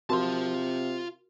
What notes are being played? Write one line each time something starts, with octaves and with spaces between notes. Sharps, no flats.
C3 F4 F#4 A#4 A5 C6